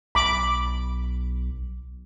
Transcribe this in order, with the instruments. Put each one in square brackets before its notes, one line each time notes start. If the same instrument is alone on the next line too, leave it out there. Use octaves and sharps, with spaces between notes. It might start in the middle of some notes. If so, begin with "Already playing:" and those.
[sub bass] B1 [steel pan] B5 D6